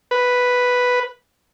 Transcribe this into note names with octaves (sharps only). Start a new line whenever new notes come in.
B4